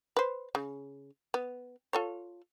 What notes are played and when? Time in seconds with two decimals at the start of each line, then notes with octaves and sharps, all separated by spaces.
0.17 B4 C5
0.55 C#3
1.34 B3
1.93 F4 A4 C#5